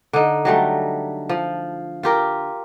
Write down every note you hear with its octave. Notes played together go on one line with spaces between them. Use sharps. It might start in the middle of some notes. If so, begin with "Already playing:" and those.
D3 D#4
F#3 G3 A3
F3
F4 G4 A#4